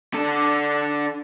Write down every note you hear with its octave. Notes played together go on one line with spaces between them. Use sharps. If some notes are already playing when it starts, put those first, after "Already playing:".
D3 A4